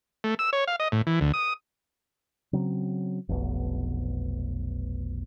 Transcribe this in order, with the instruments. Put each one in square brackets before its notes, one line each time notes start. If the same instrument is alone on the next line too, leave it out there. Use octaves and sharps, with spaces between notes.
[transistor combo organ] A3
E6
C#5
F5
D#5
A2
E3
D2
D#6
[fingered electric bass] C#3 F#3 C4
F1 B1 B2 B3